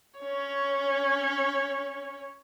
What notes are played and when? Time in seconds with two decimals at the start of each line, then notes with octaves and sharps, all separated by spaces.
0.20 C#4 C#5